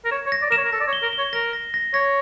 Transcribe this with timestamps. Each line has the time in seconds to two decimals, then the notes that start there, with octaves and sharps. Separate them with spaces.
0.05 A#4
0.11 C#5 E7
0.26 C#5
0.32 A#6
0.42 D5
0.50 A#4 E7
0.57 C#5
0.65 A#4
0.72 A4 A#6
0.80 D5
0.88 C#5
0.93 G7
1.02 A#4
1.13 G7
1.18 C#5
1.33 A#4 A#6
1.53 A#6
1.74 A#6
1.94 C#5 A#6